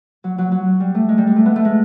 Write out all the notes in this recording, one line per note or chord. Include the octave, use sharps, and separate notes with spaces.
F#3
F#3
F#3
G3
A3
G#3
G3
G#3
A3
B3
A3
G#3